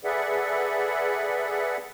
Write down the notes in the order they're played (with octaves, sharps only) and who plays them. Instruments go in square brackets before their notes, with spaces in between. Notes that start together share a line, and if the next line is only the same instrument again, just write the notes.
[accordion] G#4 A4 B4 D5 E5 F#5